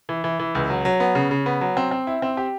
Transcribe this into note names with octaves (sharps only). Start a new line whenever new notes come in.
E3
E3
E3
C#2
F#3
F#3
B3
C#3
C#3
B3
F#3
C4
C4
E4
C4
G4